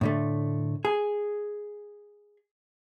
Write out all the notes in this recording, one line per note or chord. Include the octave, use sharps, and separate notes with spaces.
A2 D3 A3
G#4